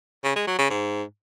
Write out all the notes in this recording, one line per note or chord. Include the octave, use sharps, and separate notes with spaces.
C#3
G#3
F#3
C#3
G#2